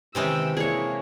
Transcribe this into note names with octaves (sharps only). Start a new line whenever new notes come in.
C3 D#3 E3 G#3 C#4 G4 G5 E6
A#3 D4 E4 G#4 C#5